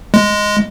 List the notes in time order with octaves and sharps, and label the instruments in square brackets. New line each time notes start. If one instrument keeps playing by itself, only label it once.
[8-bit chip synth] G#3